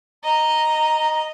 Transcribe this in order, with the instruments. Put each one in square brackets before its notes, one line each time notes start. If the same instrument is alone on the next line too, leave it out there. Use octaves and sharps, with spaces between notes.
[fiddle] D#5 [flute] A#5